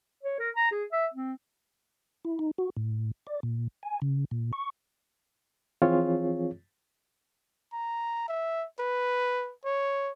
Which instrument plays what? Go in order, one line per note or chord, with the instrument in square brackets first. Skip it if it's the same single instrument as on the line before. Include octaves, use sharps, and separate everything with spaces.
[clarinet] C#5
A#4
A#5
G#4
E5
C4
[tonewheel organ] E4
D#4
F#4
A2
D5
A#2
G#5
C#3
A#2
C#6
[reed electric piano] E3 F3 C4 F4 G#4 C#5
[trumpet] A#5
E5
B4
C#5